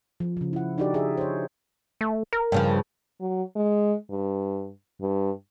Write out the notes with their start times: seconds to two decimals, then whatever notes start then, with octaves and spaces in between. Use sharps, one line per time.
0.20 F3
0.37 C#3 F3
0.53 E4 F#5
0.78 D4 D#4 F#4 G4 A4 D5
0.94 G#4 D5 E5
1.18 C5 C#5
2.01 A3
2.33 A#4
2.52 G2 C#3 F3
3.21 F#3
3.56 G#3
4.10 G2
5.01 G2